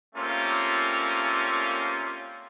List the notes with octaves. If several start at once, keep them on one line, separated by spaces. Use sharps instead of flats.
G3 A3 A#3 C4 C#4 F4